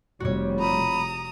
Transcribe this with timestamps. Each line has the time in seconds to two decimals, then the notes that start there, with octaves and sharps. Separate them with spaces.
0.20 F1 F2 G3 F#4 C#5
0.59 A#5 B5 D#6